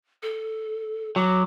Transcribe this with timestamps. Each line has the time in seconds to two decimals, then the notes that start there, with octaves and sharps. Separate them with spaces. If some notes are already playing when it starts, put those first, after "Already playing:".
0.23 A4
1.16 F#3 D6